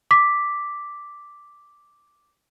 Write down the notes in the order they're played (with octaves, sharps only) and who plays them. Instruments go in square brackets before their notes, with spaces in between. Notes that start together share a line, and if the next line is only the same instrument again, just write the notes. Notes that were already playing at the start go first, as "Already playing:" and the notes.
[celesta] D6 B6